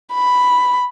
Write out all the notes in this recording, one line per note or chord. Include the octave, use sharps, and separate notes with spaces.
B5